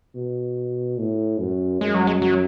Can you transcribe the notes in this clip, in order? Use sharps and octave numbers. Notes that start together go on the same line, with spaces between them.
B2
A2
F#2
F#2 G#3
F#3
G#3
F#3